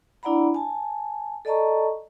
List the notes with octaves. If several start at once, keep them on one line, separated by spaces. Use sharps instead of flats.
D4 E4 D5 F#5 A#5 B5
G#5 A5
A4 D5 D#5 A5 A#5 C#6